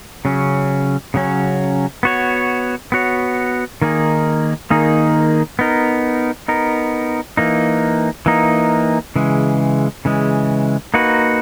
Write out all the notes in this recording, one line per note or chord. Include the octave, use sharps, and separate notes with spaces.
C#3 F#3 C#4
C#3 F#3 C#4
B3 F#4 C#5
B3 F#4 C#5
D#3 A#3 D#4 G#4
D#3 A#3 D#4 G#4
B3 D#4 A#4
B3 D#4 A#4
E3 A#3 D#4
E3 A#3 D#4
C#3 E3 G#3
C#3 E3 G#3
A#3 D#4 F#4 B4